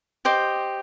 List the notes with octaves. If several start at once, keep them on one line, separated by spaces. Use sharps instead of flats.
G4 C5 D#5 D6